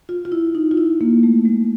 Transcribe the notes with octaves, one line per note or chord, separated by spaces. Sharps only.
F4
F4
E4
D#4
F4
E4
A#3
A3
G#3